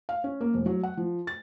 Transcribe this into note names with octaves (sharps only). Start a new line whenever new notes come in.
F5
C#4
A#3
F1
F#3
F#5
F3
A6